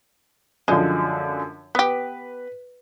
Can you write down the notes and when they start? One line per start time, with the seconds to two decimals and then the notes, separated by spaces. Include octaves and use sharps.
0.68 F#2 D3 F3 G#3
1.75 B3 G4 B4